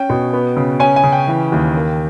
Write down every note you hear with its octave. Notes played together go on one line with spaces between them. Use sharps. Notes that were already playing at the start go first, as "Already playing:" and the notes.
Already playing: C#4 G5
B2
B3
C#3
C#4 G#5
G#5
C#3
G5
E3
D#2
A#3